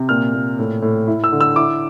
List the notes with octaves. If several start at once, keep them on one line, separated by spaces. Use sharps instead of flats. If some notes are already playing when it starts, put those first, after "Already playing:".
Already playing: C3
A#2 F6
A#2
A2
A2
E4
E6
D3
E6
E4 D6